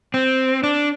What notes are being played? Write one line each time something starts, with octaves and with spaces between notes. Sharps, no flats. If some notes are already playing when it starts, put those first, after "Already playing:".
C4
D4